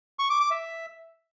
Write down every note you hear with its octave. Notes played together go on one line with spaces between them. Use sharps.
C#6
D6
D6
E5